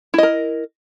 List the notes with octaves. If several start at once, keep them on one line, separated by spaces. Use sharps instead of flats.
E4 A#4 D#5